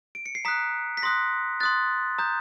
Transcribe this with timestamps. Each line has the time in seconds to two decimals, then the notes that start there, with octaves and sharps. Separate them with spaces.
0.15 D7
0.26 C#7
0.35 C7
0.45 A#5 D#6 F#6 B6
0.97 B6
1.03 C6 D#6 F#6 A#6
1.60 C6 D#6 F#6 A6
2.19 A#5 D#6 G6